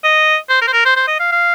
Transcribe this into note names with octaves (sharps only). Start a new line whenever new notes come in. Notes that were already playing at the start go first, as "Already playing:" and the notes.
D#5
C5
A#4
C5
A#4
C5
C5
D#5
F5
F5